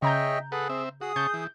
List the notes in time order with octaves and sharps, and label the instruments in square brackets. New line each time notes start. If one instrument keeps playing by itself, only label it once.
[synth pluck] C#3 A#5 G6 [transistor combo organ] G#4 C#5 [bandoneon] D#5 E5 G5
[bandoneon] G#4 [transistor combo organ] A4 B4 F#5
[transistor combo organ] C4 E5
[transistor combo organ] F#4 [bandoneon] G#4 D#6
[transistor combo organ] C#3 A5 C#6 [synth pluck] G6
[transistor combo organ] E3